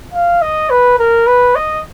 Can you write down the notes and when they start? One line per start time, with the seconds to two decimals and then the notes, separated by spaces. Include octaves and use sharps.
0.13 F5
0.42 D#5
0.70 B4
0.99 A#4
1.27 B4
1.55 D#5